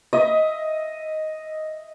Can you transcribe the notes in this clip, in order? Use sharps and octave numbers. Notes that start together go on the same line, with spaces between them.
D#5 E5